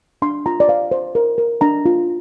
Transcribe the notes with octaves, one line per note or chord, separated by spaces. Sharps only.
D4 C6
F4 A#5
D5
C5 F5
C5
A#4
A#4
D4 A#5
F4